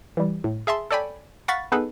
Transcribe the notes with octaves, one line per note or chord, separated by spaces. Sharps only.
E3 G3
A2
G#4 E5 A5 C6
A4 C#5 D5 G5 G#5 B5
F5 F#5 B5 C#6 A6 B6
B3 D#4 G#4 A4 B4